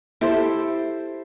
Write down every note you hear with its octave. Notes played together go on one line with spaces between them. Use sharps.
E4 G4 A4 C5